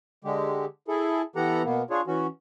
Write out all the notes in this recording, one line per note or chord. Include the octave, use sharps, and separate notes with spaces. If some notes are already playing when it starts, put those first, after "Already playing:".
D3 G#3 G4
E4 G#4 A4
E3 B3 G4 A4 F#5 A#5
B2 A#3 B3
D4 F4 G#4 C#5
E3 C#4 F#4